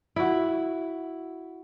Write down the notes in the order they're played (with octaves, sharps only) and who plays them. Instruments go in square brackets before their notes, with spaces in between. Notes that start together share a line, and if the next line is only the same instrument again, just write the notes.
[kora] E4 F#4